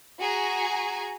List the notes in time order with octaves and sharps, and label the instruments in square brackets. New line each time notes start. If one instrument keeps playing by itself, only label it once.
[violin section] F#4 G#4 G#5 A#5